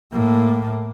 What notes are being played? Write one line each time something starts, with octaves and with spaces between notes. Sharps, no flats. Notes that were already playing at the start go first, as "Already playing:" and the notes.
A2 A#3